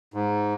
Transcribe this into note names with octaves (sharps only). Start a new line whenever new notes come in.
G#2